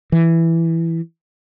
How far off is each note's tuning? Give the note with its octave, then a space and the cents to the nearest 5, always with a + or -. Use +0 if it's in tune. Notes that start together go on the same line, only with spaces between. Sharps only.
E3 +5